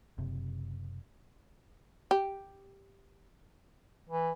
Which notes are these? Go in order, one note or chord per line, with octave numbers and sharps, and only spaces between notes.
F#1 C3
G4
E3